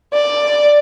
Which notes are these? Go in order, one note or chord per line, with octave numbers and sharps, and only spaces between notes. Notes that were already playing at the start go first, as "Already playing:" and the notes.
D5